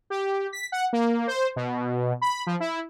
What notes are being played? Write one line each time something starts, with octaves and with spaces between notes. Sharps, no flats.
G4
B6
F#5
A#3
C5
B2
B5
F3
E4